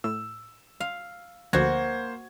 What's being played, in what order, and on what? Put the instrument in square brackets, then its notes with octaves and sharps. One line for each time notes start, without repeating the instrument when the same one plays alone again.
[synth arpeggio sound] A2 [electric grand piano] E6
[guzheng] F5
[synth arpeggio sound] D2 D3 F3 [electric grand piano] A#3 C5 G#6 [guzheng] F#4